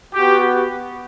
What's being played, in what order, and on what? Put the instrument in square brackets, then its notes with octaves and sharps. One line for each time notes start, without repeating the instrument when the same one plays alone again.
[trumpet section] B3 F#4 G4